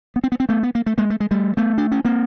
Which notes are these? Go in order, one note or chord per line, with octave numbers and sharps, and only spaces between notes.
B3
C4
B3
C4
A3 B3
B3
A#3
A3
G#3 A#3
A3
G#3
G3 A3
A3 B3
D4
C#4
A#3 C4